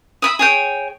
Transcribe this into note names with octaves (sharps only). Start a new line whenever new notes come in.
E5 B5 D#6
G#4 C#5 G5